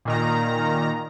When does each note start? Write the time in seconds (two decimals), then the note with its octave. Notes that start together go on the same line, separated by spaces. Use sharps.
0.05 A#2 D#3 A#5